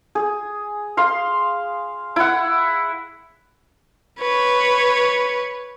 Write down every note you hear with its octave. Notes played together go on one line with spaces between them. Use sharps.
G#4
F5 C6
E4 F#5
B4 C#5